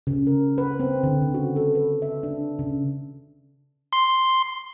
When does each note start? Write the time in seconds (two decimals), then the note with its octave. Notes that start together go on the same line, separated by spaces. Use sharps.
0.07 C#3
0.27 A#4
0.58 B4
0.80 C4
1.03 D3
1.22 C#3
1.34 F#4
1.56 A4
1.75 B4
2.02 E5
2.23 D4
2.59 C#3
3.93 C6